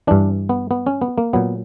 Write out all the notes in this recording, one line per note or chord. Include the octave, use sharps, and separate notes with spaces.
G2 E3 D4
B3
B3
C#4
B3
A#3
A#2 F#3 B3